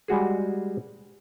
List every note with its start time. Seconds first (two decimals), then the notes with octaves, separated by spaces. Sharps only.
0.08 G3 G#3 F#4 G#4